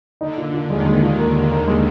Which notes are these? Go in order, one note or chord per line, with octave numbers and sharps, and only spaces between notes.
D3 D#4
A#2
A#2
D#2 D#3 G#3
G#3
A#2
A#4
A#4
A#4
G#3